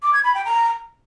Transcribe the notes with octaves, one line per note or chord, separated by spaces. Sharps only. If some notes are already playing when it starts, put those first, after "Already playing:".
D6
G#6
B5
G5
A#5